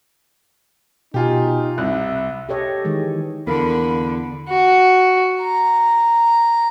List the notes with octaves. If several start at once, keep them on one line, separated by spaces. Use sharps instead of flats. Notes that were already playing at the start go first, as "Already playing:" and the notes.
B2 D#4 F4 G4 G#5
C2 E5 F#6
G4 A4 C#5 D#5
D#3 E3 G#3
E2 D3 A#3 B5
F#4
A#5